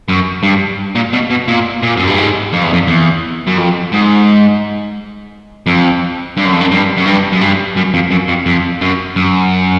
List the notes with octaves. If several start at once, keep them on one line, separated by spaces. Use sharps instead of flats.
F#2
G2
A#2
B2
B2
A#2
A#2
F#2
G2
G#2
F2
E2
F2
E2
F#2
F2
G#2
F2
G2
F#2
F2
F#2
G2
F#2
G2
F#2
G2
F#2
F2
F#2
F2
F2
F#2
F#2